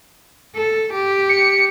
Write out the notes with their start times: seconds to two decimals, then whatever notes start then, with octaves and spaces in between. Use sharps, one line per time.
0.56 A4
0.93 G4
1.29 C#7